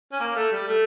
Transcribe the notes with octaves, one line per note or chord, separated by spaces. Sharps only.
C#4
A#3
A3
G3
A3